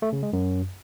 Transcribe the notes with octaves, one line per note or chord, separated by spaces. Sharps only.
A3
C#3
G#3
F#2